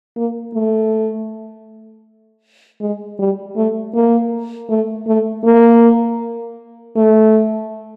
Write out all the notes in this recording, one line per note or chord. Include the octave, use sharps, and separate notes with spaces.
A#3
A3
G#3
G3
A3
A#3
A3
A3
A#3
A3